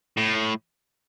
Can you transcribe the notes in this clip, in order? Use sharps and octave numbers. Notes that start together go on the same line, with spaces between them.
A2